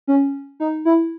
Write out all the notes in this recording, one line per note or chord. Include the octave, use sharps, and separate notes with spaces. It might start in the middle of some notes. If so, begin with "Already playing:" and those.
C#4
D#4
E4